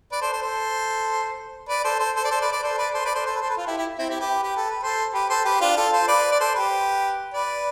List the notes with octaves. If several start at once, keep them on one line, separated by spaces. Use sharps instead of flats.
B4 D5
A4 C5
A4 C5
A4 C5
B4 D5
A4 C5
A4 C5
A4 C5
D5
A4 C5
B4 D5
B4 D5
A4 C5
B4 D5
A4 C5
B4 D5
A4 C5
A4 C5
B4
A4 C5
B4
F4 A4
E4 G4
E4 G4
C4 E4
E4 G4
G4 B4
G4
A4
B4
A4 C5
G4 B4
A4 C5
G4 B4
D4 F4
F4 A4
A4 C5
B4 D5
D5
A4 C5
G4 B4
B4 D5